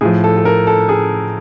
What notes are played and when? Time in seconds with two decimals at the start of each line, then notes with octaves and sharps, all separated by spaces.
0.01 A2 F3 G#4
0.24 A4
0.37 A4
0.45 A#4
0.67 A4
0.89 G#4